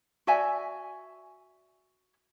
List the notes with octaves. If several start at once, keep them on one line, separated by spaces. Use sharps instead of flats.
F#4 D5 E5 G#5